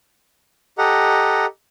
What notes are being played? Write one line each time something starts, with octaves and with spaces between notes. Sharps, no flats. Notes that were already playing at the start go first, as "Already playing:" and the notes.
G4 A4 D#5 F#5 A#5